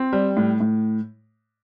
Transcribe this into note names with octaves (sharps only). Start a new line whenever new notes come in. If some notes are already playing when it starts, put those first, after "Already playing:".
Already playing: C4
G3
A2
A2